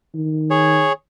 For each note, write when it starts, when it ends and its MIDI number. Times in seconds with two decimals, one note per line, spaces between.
0.14 0.88 51
0.50 0.93 68
0.50 0.93 73